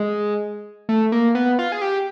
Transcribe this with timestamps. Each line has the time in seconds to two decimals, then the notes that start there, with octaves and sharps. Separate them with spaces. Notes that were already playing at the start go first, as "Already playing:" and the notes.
Already playing: G#3
0.89 A3
1.12 A#3
1.35 B3
1.59 F4
1.72 G#4
1.82 G4